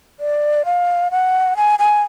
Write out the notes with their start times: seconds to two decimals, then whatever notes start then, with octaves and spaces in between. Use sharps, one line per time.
0.20 D5
0.65 F5
1.11 F#5
1.57 G#5
1.79 G#5